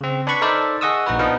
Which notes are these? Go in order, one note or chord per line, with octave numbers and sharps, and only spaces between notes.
C#3 C4
D4 B4 D5 B5 C#6
D#4 A4 A#4 C5 D5 E5
G#4 D#5 F#5 C#6 D#6 E6
A#1 D#4 F#4 B4
F3 B3 D4 D#4 A#4